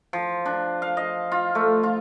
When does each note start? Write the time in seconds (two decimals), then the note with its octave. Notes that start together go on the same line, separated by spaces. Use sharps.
0.13 F3
0.45 D4
0.82 F5
0.97 D#5
1.32 F4
1.55 A3
1.83 F4